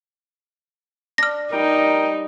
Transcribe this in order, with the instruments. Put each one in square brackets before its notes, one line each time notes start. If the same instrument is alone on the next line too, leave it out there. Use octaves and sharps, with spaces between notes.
[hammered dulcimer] D4 [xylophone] F6 A#6
[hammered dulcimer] G3 [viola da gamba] D#4 [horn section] A#4 G5